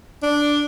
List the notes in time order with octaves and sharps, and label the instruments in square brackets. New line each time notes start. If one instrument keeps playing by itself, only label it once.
[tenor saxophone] D4